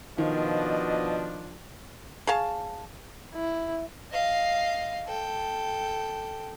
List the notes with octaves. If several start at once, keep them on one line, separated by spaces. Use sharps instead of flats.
B2 D#3 F3 D4 D#5
G#4 C#5 F5 A5
E4
D#5 F5
A4 G5